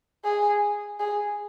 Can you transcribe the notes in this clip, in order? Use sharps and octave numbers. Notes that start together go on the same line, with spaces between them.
G#4
G#4